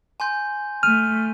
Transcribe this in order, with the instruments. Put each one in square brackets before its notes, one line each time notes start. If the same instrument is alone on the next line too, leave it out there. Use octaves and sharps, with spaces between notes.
[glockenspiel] G#5 C6 G6
[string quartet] A3 [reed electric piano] F6 [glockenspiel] D#7